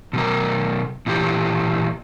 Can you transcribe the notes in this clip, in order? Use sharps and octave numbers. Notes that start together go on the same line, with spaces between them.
B2 F#3 A#4
A#2 E3 G4